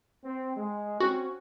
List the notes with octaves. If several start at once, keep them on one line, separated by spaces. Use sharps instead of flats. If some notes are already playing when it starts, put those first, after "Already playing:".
C4
G#3
C4 C#4 F#4